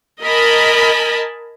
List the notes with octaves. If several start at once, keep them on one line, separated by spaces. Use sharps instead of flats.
A#4 D#5 G#5 A5 B5